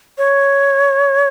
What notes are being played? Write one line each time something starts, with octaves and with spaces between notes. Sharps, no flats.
C#5